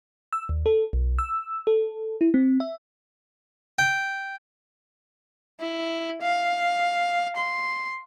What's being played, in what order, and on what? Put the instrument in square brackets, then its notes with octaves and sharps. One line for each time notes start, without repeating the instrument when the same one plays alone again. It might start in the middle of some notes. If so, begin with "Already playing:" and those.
[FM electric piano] E6
D#2
A4
B1
E6
A4
E4
C4
E5
[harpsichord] G5
[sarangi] E4
F5
C6